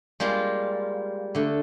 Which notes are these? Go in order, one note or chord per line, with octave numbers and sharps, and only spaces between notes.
G3 G#3 A#3 F4
D3 A3